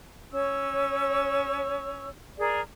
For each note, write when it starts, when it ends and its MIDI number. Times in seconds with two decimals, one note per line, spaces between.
0.33 2.08 61
0.33 2.08 73
0.33 2.08 85
0.33 2.08 88
2.39 2.60 68
2.39 2.60 70
2.39 2.60 74